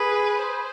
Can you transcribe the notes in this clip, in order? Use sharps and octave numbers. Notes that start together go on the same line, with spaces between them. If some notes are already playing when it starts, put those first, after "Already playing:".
Already playing: G#4 B4
C5